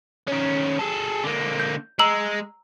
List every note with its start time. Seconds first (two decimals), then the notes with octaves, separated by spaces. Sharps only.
0.28 D#3 C#4
0.79 G#4 A4
1.24 D3 A#3
1.60 G6
1.99 G#3 A#5 E6 F#7